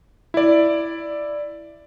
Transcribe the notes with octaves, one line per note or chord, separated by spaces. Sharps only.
E4 D5